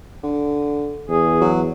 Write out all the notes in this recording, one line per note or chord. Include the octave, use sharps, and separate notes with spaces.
D3
E2 G#4
F#3